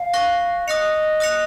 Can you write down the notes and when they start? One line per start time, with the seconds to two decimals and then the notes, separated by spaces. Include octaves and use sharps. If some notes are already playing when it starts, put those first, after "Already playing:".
Already playing: F5
0.14 C#6 F#6 A#6
0.68 D#5 D#6 F#6 A#6 C#7 F7
1.20 D#6 F#6 A#6 C#7 F7